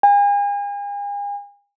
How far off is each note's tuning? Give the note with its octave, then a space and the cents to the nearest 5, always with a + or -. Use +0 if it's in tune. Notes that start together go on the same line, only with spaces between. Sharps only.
G#5 -40